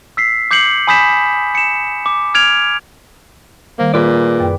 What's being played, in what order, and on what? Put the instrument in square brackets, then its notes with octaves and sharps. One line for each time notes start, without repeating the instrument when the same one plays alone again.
[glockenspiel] E6 B6 C7
D6 G6 C7 C#7 F#7
G#5 B5 D#6 G6 B6 E7
C#7 E7
D6
F6 G#6 D7 F7
[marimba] D#3 G3 C5 [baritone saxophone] A#3
[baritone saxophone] A#2 [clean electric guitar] G#4 B4 D5
[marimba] F#2 G5